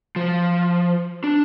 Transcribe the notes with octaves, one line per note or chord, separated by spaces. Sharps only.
F3
D4